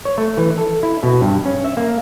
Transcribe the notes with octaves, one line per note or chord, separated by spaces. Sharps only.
C#5
A3
E3
A4
E4
B2
G2
C#4
E5
A#3